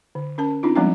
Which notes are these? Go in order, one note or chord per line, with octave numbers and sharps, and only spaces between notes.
D3
C#4 A#4 A5
C4 D4 D#4 F4
F3 G3 G#3 B3 C4 D4